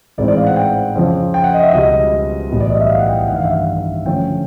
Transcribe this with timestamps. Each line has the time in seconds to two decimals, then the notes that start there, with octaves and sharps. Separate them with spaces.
0.18 A1 G#2 E3 G#3 C4 D5
0.28 D5
0.37 F5
0.47 F#5
0.56 G5
0.95 F2 C#3 F3
1.34 G5
1.44 F#5
1.54 D#5
1.63 E5
1.73 C#2 B2 G3 D#5
2.51 B1 A2 E3 G3 B3
2.60 D5
2.70 D#5
2.80 E5
2.89 F5
2.99 F#5
3.09 G5
3.28 A1 G2 D#3 F#5
3.36 F5
3.45 E5
3.54 F5
4.05 F#2 D3 F3 A3 C#4 G5